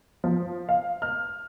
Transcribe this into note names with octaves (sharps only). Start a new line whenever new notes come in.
F3
F5
F6